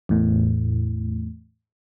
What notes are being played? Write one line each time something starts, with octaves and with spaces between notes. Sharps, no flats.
E2 A2